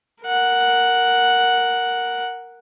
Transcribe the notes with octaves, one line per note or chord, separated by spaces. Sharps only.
A#4 F#5